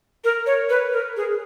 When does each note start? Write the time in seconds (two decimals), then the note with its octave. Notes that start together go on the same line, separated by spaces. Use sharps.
0.24 A#4
0.46 C#5
0.70 B4
0.93 A#4
1.17 G#4